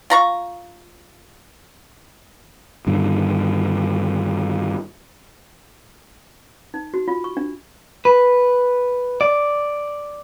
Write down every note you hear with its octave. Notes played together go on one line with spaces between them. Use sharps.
F4 A#5 C#6
G2 D3 D#3
D#4
F#4
F4
C#6
D4
B4
D5